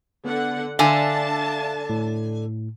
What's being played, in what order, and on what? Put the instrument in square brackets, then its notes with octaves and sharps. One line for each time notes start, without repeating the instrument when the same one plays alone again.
[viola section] D3 F#5 [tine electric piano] B3
[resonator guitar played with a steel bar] D3 G#5 [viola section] D4 A5 [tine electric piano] E5 F5
[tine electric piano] A2